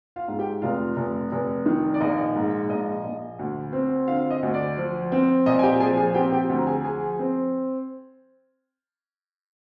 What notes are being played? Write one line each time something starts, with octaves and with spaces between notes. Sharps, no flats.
F4 F5
G#2
G4 G5
F1 F4 F5
F1
F1
D#3
D5
A#1 D#5
G#2
A#1 D#5
A#1
D2
C4
D3 F4 F5
D#5
D2
D5
F3
C4
A#2 D#5
G#5
G4 G5
F3 G#4 G#5
G#4 G#5
C4 G4 G5
G4 G5
D2
A#5
G#4 G#5
F3 G#4 G#5
C4